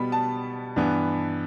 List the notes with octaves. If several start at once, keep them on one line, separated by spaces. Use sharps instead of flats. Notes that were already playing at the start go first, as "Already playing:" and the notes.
Already playing: B2 G3 B3 B5
A5
G2 E3 B3